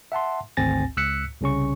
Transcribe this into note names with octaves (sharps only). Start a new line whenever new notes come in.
E5 F#5 A5 C6
G#1 D2 C4 G#5 A6 A#6
C#2 E6 F#6 B6 C#7
C2 C#3 C#4 C#6